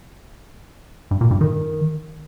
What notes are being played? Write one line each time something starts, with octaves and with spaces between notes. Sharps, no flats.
G2
A#2
G2
D#3